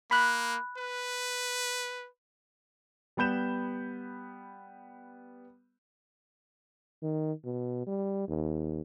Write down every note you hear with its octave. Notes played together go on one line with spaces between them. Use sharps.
A#3 B5 F#6
B4
G3 B3 B5 G6 E7
D#3
B2
G3
D#2